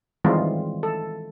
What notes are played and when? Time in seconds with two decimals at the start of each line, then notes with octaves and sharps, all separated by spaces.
0.24 D#3 E3 G3 G#3 C4 F4
0.83 A4